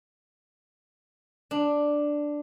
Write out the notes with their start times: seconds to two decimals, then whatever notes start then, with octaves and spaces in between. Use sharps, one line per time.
1.51 D4